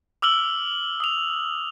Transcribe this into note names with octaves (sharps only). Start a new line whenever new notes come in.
D6 E6 F6 F#7 G7
D#6 F7